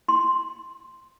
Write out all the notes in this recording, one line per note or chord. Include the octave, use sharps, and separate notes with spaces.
C6